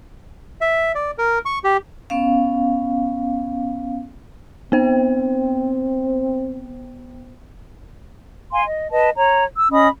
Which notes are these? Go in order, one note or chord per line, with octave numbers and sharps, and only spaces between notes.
E5
D5
A#4
C#6
G4
B3 C#4 F5
B3 C4 C5 G5
F5 G#5 C6
D#5
B4 D#5 A5
C#5 A#5
E6
C#4 D#5 B5 D#6